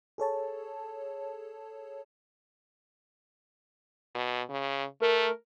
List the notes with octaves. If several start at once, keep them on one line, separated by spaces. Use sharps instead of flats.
G#4 A4 C#5 A5
B2
C#3
A3 A#4